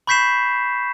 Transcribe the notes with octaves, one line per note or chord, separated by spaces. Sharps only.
B5 C#6 G6 B6 C7 E7